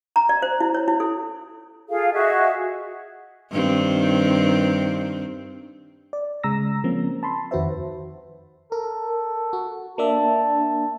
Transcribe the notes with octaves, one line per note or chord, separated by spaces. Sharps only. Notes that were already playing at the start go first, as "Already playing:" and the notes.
A#5
D5
C5
E4
C#5
E4
A4
F4 G#4 A4 F5
F#4 G#4 D#5 E5
G2 D#3 C4
D5
C#3 G#3 A#5 E6 A#6
F3 A#3 C4 C#4
A5 B5 C6
F2 D#3 F#4 B4 C5 E5
A4 A#4
F#4
A#3 D4 E5 A5